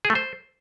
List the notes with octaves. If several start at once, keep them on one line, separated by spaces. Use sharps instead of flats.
G#4
A3
C5